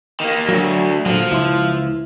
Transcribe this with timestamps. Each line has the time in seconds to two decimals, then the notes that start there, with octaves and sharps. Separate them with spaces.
0.20 D#3 A#3
0.49 D2 F#3
1.06 A#2 D3 F3 F#3
1.31 C#2 E4 C6